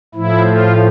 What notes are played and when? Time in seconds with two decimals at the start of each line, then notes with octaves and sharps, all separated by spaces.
0.15 A2 F3 E4
0.45 F4